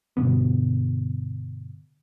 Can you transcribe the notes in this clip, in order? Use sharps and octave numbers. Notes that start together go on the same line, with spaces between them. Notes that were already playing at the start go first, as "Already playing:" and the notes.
G2 B2 D3 B3